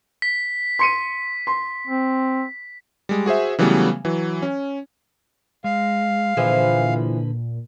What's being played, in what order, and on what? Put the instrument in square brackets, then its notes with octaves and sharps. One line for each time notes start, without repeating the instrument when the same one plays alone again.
[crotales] B6
[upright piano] C6 C#7 D#7
C6
[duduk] C4
[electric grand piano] G3 G#3
F#4 G#4 C5 E5
C#3 E3 F#3 G3 A3 B3
E3 F#3
C#4
[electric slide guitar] G#3 [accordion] F5
[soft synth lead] A#2 [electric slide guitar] D3 B4 [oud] E3 F3 G#4